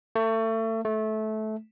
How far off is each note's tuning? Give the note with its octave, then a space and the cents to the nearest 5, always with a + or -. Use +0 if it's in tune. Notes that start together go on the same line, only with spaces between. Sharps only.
A3 +30
A3 -20